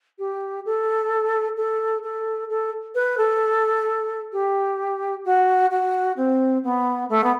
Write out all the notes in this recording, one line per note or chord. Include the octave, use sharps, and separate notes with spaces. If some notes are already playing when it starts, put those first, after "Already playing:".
G4
A4
A4
A4
A4
B4
A4
G4
F#4
F#4
C4
B3
A3
B3